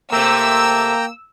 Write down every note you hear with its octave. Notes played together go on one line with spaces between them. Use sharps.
C3 A3 A#3 G5 A#5 E6